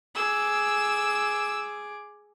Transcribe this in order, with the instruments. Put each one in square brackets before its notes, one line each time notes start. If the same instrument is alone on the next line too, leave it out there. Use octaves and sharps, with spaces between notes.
[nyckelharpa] G#4 D6 [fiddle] E6